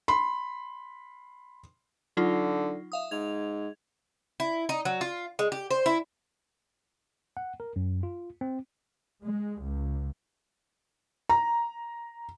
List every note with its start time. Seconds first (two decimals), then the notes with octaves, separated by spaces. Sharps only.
0.08 B5 C6
2.17 D3 F#3 D#4 F4
2.92 E5 F5 D#6
3.11 G#2 G#6 F7
4.40 E4
4.69 D#4
4.85 F#3
5.01 F4
5.39 G#3
5.52 G4
5.71 C5
5.86 E4
7.37 F#5
7.60 A#4
7.76 F#2
8.03 F4
8.41 C4
9.22 G#3
9.62 C#2
11.29 A#5